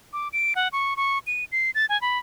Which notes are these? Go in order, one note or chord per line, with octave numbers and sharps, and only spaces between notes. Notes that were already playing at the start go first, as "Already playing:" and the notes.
D6
D7
F#5
C#6
C#6
D#7
C7
A6
G#5
B5